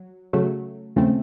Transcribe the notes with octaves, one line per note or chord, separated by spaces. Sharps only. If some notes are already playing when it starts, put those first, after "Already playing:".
Already playing: F#3
C#3 F#3 A3
D#2 C#3 F3 A3 C4